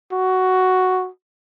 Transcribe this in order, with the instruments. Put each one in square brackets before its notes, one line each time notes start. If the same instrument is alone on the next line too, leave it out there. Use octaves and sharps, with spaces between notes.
[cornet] F#4